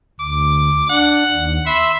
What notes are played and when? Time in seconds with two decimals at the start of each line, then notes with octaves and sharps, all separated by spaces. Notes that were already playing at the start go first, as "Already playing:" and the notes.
0.20 D2 D6
0.89 D4 F#5
1.32 D#2
1.66 E5 B5 C6